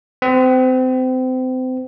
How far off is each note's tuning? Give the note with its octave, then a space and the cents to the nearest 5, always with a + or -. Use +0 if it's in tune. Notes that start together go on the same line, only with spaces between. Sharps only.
C4 -30